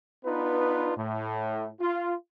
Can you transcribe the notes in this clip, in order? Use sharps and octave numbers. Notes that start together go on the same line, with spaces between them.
B3 D4 D#4 F4 B4
A2
F4